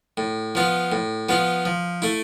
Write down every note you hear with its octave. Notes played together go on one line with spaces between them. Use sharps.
A2
F3 B3 F4
A2
F3 B3 F4
F3
A3 E4